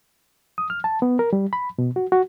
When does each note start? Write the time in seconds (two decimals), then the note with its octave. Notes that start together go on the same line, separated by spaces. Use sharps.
0.58 D#6
0.70 F6
0.84 A5
1.02 B3
1.19 A#4
1.33 G3
1.53 B5
1.78 B2
1.96 F#4
2.12 F#4